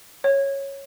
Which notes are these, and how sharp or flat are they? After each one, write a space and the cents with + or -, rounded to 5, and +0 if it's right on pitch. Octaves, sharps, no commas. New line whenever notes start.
C#5 -10